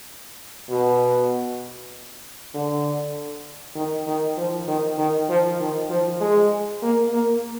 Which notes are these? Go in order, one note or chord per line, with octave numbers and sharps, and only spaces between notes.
B2
D3
D#3
D#3
F3
D#3
D#3
F3
D#3
F3
G#3
A#3
A#3